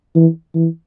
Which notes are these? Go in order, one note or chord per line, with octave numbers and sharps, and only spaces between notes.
E3
E3